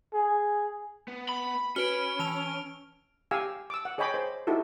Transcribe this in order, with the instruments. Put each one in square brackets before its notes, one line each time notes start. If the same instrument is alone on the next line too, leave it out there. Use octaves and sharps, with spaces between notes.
[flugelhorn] G#4
[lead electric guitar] B3
[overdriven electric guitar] B5
[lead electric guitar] C#4 [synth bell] F#4 B4 [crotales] F6 D7
[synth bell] E3 A5 F7
[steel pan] G4 F5 G#5 E6
D6 E6
F#5
G#4 C#5 D#5 G5 B5 D6
C5
D#4 E4 F#4 G4 A4